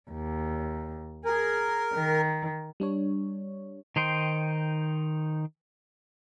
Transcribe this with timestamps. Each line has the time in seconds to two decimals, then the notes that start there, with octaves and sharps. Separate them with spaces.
0.11 D#2
1.25 G#4 A#4
1.95 D#3
2.80 G3 D4 C#5
3.96 D#3 D#4 C5 G5 C6